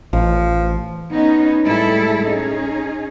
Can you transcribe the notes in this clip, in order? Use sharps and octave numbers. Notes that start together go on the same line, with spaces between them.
A1 F3
B3 C#4 D#4
A2 G3 G#3 E4 G#4 A4
C#4 D#4 G#4